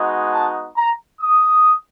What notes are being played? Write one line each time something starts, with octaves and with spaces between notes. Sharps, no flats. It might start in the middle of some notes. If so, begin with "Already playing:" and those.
Already playing: G#3 B3 D#4 F#4
A5
A#5
D#6